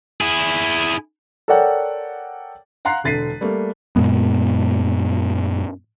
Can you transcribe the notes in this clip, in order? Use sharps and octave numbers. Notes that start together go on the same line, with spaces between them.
E4 G#4
A4 A#4 C#5 D5 F#5 G5
F5 F#5 A#5 C6 F#6 C7
E1 D3 A6 B6 C7 D#7
G3 A3 A#3
F#2 A#2 G#3 B3